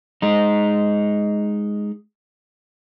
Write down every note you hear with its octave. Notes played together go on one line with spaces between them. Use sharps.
G#3 D#4